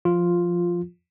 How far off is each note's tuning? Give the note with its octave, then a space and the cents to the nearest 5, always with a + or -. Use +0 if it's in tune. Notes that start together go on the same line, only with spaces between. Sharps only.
F3 +0 F4 +0